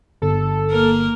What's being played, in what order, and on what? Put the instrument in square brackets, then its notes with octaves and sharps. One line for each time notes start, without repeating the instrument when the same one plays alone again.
[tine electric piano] G1 [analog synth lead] A4
[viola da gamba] A#3 A#4